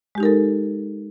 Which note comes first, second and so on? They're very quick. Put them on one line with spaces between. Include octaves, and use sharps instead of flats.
G#3 G4 D#4 A#4 A4